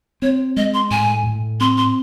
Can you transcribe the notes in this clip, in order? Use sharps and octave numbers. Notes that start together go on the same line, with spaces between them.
C4 C#5
G#3 D#5
C6
A2 G#5
A2
C4 C6
C6